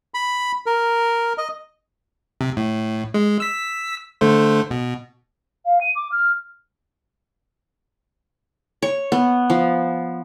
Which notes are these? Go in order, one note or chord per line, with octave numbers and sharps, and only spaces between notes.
B5
A#4
D#5
C3
A2
G#3
E6 B6
D3 A3 C5
B2
F5
D#7
D6
F6
C#5
B3
F3